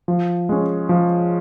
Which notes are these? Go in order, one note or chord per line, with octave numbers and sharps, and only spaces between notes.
F3
G#3 C#4
F3